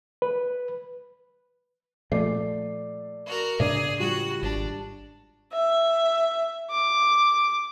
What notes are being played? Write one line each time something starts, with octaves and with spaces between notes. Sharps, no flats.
B4
A#2 F3 A3 D5 C7
F#4 A#4
A2 C#3 D4 G#4 D5
F3 G3 F#4 F#5
G#1 D4
E5
D6